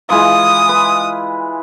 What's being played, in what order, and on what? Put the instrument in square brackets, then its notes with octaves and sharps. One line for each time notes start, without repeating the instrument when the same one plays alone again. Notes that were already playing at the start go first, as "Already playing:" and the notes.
[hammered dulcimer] E3 G#3 F4 [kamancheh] D#6
[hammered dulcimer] B4